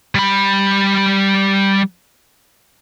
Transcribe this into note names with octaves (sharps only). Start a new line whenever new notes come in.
G3 B5